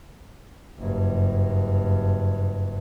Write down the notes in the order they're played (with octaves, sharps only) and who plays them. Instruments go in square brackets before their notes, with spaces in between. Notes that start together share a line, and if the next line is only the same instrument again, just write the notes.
[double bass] F#1 G2